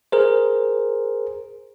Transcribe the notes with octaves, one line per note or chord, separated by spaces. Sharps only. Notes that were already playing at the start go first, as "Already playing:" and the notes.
G#4 A#4 C5